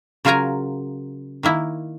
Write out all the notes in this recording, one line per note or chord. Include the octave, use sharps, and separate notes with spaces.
C#3 F#3 F4 A#4 G#5 A#5
D#3 A#3 E4